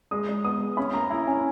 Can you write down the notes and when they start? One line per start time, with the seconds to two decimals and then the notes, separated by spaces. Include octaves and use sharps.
0.11 G#3 D#6
0.29 G#3
0.44 B3 D#6
0.61 G#3
0.77 C#4 B5
0.94 A#3 A#5
1.10 E4 A#5
1.27 C#4 G#5